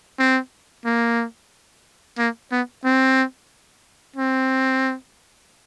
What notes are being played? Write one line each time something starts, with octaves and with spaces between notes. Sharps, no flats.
C4
A#3
A#3
B3
C4
C4